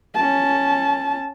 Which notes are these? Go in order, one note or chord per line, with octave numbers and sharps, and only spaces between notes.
C#4 A5